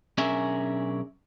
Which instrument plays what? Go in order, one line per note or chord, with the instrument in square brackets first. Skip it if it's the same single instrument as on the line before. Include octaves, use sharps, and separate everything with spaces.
[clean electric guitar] B1 C#4 D4 G#4 A#4 E5